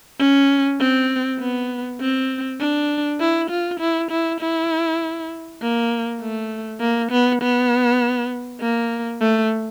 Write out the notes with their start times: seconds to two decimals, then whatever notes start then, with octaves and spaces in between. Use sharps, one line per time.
0.20 C#4
0.80 C4
1.40 B3
2.01 C4
2.61 D4
3.20 E4
3.50 F4
3.80 E4
4.11 E4
4.40 E4
5.61 A#3
6.21 A3
6.81 A#3
7.11 B3
7.42 B3
8.61 A#3
9.21 A3